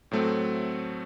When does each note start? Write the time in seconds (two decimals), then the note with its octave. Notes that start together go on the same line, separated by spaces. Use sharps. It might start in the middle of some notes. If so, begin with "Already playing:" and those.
0.11 A2 F#3 A3 C4